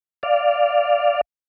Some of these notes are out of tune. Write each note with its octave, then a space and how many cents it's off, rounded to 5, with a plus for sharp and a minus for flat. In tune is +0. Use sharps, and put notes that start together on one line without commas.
D5 +0 F5 +0